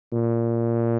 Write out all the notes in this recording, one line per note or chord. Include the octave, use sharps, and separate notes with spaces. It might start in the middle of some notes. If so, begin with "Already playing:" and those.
A#2